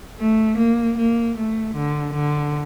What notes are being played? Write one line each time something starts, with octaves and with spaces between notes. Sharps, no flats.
A3
A#3
A#3
A3
D3
D3